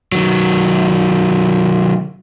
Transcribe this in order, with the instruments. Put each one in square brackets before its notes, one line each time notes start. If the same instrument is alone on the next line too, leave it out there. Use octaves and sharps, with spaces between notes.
[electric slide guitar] D#3 F#3